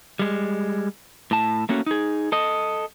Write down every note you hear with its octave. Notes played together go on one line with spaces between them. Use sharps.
G3 G#3
A2 A5
A3 A#3 C#4 F#4
D#4 G#4
A4 D#5